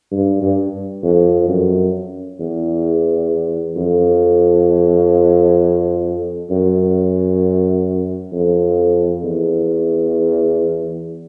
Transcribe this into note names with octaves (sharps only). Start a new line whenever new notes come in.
G2
G2
F2
F#2
E2
F2
F#2
F2
E2